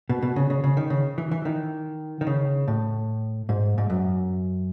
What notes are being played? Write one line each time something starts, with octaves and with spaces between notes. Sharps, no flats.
B2
B2
C#3
C#3
C#3
D#3
C#3
E3
E3
D#3
D#3
C#3
A2
G#2
G#2
F#2